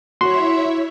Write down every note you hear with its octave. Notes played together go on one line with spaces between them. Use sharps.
E4 F#4 C#5 E5 C6